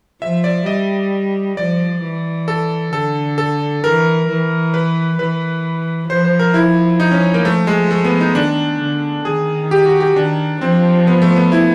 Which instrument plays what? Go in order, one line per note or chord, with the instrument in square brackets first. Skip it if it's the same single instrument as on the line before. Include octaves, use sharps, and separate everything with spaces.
[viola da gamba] F3 [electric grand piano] E5
[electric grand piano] D5
[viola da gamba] G3 [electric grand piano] D#5
[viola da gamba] F3 [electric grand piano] D5
[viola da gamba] E3
[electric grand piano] A4
[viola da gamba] D3 [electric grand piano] A4
[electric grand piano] A4
[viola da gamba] E3 [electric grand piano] A#4
[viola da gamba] E3
[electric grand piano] B4
[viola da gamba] E3 [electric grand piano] B4
[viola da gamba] F3 [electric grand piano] C5
[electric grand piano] C5
A#4
E4
D#4
C#4
A#3
[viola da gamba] F3 [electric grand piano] A3
[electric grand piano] G#3
A3
B3
D#4
[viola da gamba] D#3 [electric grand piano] D4
[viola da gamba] D3
[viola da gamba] D#3 [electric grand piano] G#4
[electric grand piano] G4
F#4
G4
[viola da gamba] D#3 [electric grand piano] D4
[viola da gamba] F3 [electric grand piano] C4
[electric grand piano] B3
A3
B3
E4